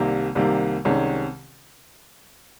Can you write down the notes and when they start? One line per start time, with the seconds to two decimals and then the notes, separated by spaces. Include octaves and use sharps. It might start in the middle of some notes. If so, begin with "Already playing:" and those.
Already playing: C2 C3 D#3 G3 A#3
0.35 C2 C3 D#3 G3 A#3
0.85 C2 C3 D#3 G#3 C#4